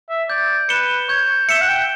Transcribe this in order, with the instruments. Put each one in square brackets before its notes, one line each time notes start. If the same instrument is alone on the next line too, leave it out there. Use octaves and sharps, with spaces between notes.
[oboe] E5
[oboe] D5 [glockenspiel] G6
[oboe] B4 [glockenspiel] C#7 E7 G7
[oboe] C#5 [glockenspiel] G6
[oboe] E5 [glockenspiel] C#7 E7 G7
[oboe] F#5
G5